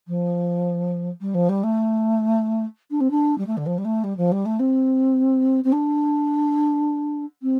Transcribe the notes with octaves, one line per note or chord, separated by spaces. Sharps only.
F3
G3
F3
G3
A3
D4
C4
D4
G3
A3
D3
F3
G3
A3
G3
F3
G3
A3
C4
C4
D4
C4